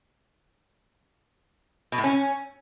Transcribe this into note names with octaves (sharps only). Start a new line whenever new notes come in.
B2
A2
C#4